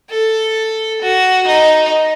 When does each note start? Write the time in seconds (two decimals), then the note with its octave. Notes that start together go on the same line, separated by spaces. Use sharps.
0.10 A4
1.01 F#4
1.47 D#4